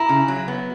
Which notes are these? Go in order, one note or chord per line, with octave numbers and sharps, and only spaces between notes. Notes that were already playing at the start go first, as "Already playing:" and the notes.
Already playing: E4 A#5
C#3
F#3
B3